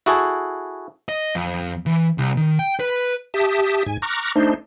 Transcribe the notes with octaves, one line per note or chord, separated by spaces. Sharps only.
E4 F#4 G#4 A4
D#5
F2
E3
C2
D#3
G5
B4
G4 E5 A5 D#6
G#2 G#5
A#5 C#6 D6 F6 F#6 A#6
A3 D4 D#4 C5